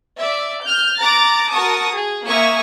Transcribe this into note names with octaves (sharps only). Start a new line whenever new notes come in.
D5 E5
F6 G6
A#5 D6 F#6 A6
F#4 A#4 A5 C#6 D#6
G#4
A#3 E5 G#5 C#6 D#6